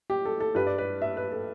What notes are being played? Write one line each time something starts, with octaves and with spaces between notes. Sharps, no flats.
G4
A4
A4
G2 G3 B4
D5
B4
E5
B4
A4